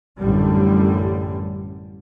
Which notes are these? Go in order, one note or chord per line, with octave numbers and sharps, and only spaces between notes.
A1 F#2 D3 G3